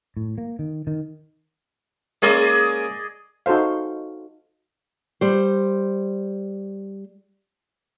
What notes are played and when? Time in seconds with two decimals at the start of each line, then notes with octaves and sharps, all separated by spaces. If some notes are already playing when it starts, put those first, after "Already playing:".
0.17 A2
0.38 A#3
0.59 D#3
0.87 D#3
2.22 G#3 A#3 C#4 G#4 D5 D#5
3.46 D#4 F#4 A4 C5 F5
5.21 G3 C5